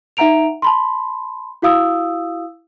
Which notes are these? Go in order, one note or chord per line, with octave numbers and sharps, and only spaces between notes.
D#4 E5 F#5 A#5 D7 F7
A5 B5 C6
E4 F#4 F5 D#6 E6